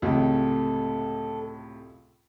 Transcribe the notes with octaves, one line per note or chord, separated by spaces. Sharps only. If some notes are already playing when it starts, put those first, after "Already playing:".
C#2 A2 C3 A4